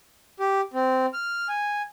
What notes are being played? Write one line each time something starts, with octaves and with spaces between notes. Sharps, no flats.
G4
C4
F6
G#5